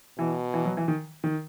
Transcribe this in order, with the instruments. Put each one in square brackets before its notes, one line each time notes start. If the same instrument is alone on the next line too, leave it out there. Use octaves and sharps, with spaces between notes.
[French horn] B2 [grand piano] E3
[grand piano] E3
F#3
E3
D#3
D#3